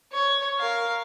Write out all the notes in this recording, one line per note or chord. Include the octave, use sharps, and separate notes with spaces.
C#5
A#4 F5